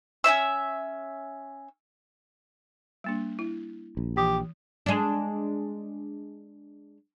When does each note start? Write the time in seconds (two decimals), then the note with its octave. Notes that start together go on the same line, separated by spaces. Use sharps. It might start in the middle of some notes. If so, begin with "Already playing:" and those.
0.24 C#4 E4 E5 E6
3.04 G3 A#3 D4
3.39 E4
3.97 A#1
4.17 E3 G4
4.86 G#3 D4